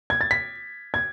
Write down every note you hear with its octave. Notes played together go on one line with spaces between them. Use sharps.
G#6
A6
B6
G#6